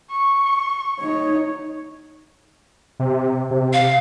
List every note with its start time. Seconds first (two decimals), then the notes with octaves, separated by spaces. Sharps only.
0.11 C#6
1.00 D#4 C#5
3.00 C3
3.51 C3
3.73 F5